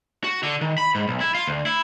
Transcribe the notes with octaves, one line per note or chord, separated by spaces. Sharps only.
F#4
D3
D#3
B5
G#2
B1
E4
F4
D2
E4